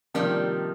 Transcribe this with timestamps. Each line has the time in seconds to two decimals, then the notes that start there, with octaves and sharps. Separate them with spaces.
0.14 C3 D#3 F3 G3 A#3 D4